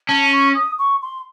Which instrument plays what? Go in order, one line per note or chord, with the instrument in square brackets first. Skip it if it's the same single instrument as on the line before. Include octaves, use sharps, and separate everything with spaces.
[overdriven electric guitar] C#4 [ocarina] A5
[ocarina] C#6
D#6
C#6
C6